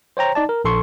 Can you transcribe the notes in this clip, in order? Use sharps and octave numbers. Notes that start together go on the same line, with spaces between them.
C5 C#5 G5 A#5
D#4 D5 A5
A#4
A#1 A4 C6 C#6